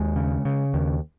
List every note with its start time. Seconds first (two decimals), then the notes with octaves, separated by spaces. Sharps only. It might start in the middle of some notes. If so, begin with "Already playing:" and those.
Already playing: D#2 G#3
0.16 C#3
0.45 C#3
0.74 D#2